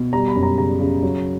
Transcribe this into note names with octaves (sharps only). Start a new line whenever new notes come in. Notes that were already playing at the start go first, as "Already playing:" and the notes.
Already playing: B2
G3 A#5
B5
F#2
A#5
C#3 A#5
C#3
F#3